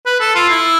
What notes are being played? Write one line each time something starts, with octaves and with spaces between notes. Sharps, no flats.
B4
A4
F4
E4